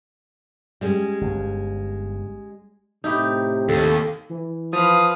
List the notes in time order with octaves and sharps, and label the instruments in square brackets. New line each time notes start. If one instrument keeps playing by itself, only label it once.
[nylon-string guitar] G3 G#3 C#4
[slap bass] G1
[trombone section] A2 C3 [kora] D#4 E4 G4
[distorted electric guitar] D#2 [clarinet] A4
[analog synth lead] E3
[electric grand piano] F3 [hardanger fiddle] B4 F5 [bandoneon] D#6